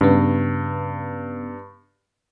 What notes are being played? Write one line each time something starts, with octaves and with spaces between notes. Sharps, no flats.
G2 C#3 B3